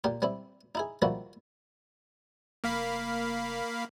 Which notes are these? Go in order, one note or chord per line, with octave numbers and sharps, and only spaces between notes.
A#2 A#3 F4 G4
G3 C4 E4
D#4 E4 G#4
D#3 F3 G3 A#3 E4 F#4
F1 A#3 F5 B5